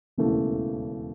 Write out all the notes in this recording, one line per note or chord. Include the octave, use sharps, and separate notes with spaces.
E1 D#2 C#3 E3 A3